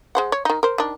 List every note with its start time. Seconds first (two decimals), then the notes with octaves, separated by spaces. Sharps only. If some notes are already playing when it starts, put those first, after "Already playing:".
0.15 G#3 C5 F#5
0.32 C#5
0.45 D#3 D#4
0.63 A#4 C5
0.78 D#3 D4